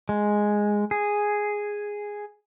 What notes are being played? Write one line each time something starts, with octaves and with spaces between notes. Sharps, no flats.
G#3
G#4